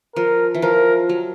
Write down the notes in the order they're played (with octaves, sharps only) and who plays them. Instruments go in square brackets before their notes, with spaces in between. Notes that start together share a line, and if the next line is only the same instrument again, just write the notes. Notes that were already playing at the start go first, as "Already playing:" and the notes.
[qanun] F3 [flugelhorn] A#4
[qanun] E3
[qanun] F3 [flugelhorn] A#4
[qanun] F#3